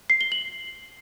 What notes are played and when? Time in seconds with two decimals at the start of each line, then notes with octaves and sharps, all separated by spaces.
0.10 C7
0.21 G7
0.32 F#7